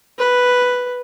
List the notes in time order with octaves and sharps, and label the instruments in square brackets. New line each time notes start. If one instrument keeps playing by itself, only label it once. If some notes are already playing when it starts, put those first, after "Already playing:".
[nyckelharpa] B4